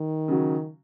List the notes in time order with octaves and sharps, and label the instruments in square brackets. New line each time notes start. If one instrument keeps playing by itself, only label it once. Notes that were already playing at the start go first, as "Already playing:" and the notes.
Already playing: [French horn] D#3
[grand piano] C#3 F#3